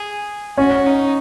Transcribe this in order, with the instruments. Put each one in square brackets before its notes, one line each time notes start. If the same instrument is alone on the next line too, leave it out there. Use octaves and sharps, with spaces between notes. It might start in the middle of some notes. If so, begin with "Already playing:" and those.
Already playing: [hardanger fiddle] G#4
[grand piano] C#4 [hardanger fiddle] F#4
[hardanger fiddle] D#4